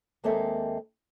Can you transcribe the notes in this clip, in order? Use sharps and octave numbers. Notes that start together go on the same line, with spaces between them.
D#2 G#3 A#3 C4 A4 E5